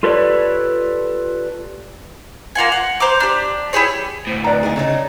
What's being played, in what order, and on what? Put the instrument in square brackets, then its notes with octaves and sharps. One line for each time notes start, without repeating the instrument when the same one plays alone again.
[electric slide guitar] F4 G4 A4 B4 C#5 D5
[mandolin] A#3 F4 F#5 G#5
F#5
C5 A#5 D6
D4 G4
E4 G4 G#4 C#5
[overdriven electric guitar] D2 A2 [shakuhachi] C5
[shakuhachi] B4 [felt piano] D5 A#5
[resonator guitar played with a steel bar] A#2 G#3 G#4 [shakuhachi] D#4
[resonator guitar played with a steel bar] C#3 A3 D#4 [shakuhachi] C#5